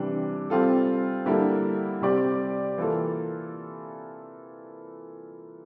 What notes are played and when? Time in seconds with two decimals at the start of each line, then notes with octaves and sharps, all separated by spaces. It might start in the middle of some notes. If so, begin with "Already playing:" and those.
Already playing: C3 E3 G3 D4
0.50 G3 C4 F4 A4
1.25 D3 G3 A#3 E4 A4
2.01 C3 G3 C4 G4 D5
2.78 E3 A#3 F4 A4